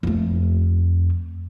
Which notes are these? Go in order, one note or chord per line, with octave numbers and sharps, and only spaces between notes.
F2 A3